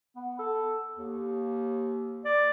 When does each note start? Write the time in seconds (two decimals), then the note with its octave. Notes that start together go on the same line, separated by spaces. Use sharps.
0.16 B3
0.39 A4
0.97 D#2
2.25 D5